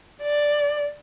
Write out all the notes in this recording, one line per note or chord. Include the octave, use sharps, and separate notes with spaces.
D5